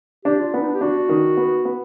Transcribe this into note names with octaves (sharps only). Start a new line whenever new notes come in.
D4 G4
F4
B3 C#4
D#4
D4
G4
D4 F#4
D#3
B3
B3